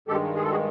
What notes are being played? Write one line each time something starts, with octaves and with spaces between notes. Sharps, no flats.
G2 D#3 G#3 G4 A4
G#4
A4
F#4 G#4